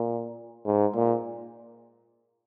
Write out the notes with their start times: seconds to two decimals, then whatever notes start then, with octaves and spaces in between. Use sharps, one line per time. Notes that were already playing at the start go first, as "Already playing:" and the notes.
Already playing: A#2
0.65 G#2
0.95 A#2